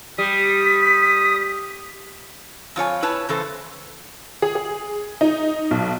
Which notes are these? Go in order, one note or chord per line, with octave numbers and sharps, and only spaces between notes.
G3 D#6 B6
F2 F4 C#5 G#5
E4 B4 C#5 A5
C#3 E3 A4 C5
G#4
G#4
D#4
B1